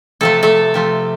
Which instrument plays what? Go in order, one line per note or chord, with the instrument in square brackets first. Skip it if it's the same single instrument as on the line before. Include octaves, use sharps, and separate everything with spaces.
[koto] C3 F3 A3 A4
A3 A4
C3 F3 A3